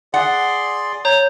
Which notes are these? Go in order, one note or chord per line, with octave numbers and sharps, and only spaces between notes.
G#4 D5 F#5 C6
C#5 A#5 G6